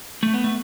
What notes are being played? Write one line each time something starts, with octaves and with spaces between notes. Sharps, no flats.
A3
B3
A3